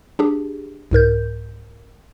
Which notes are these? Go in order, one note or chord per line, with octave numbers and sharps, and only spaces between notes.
D4 G4 G#4
C2 G#2 A#4 G6